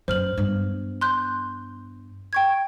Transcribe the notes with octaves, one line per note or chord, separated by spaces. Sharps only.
F#2 C5 F6 F#7
G2 B3
C6 F#6 G6
G5 C#6 G#6